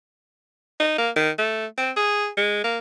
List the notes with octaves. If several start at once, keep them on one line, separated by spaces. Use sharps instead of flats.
D#4
A#3
D#3
A3
C4
G#4
G#3
A#3